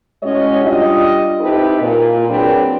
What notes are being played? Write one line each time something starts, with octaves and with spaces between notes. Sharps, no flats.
A2 G#3 C#4 F#4 C#5 D#5
G3 D4 F4 D#5
C4 D#4 E4 G4 A4 B4
A#2
F#3 A#3 C4 D4 G#4 B4